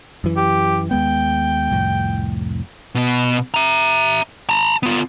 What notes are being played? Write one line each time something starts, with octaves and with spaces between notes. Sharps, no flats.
F#2 E3
G4
D#2 G#3 B3 G5
C2 F2 A2
B2 B3
E5 A#5
A5 A#5
B3 F4